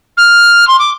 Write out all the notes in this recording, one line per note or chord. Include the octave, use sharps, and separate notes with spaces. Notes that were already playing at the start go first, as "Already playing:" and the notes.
F6
C6
D6